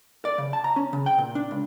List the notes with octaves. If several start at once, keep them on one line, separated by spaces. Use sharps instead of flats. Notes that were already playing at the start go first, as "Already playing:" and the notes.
D5
C#3
A5
A#5
C#4
C#3
G5
A#2
D4
C#2